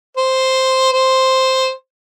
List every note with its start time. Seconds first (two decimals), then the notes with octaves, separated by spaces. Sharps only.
0.17 C5
0.92 C5